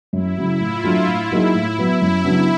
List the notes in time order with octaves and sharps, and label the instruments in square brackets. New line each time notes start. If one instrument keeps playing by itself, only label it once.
[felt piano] F#2 [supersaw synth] E4
[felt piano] C#3 F#3
[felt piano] A2 [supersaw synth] F4
[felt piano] F#3 A3 D4
[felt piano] A2 [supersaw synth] E4
[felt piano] F#3 A#3 D#4 G#4
A2
F#3 B3
[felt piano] F#2 [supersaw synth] E4
[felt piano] C#3 F#3 B3 D4